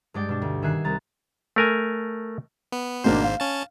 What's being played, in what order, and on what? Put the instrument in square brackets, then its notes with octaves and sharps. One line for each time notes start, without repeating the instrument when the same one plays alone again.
[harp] G2 G#3 D5 G5
B2 D4
D2
D#3 E5 G#5 F#6 C7
C2 A#5 A6
[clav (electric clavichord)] A3 A#4 G#5
[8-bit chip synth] B3
[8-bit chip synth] G#1 G#2 C5 [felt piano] B2 A#3 D4
[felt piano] F5
[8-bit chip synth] C#4 A5